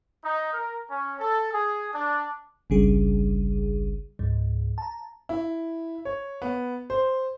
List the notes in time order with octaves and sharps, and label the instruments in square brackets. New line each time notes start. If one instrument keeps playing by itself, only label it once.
[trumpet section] D#4
A#4
C#4
A4
G#4
D4
[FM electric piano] G1 C2 C#3 G3 G#4
C#2 G#2
A5 A#5
[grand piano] E4
C#5
B3
C5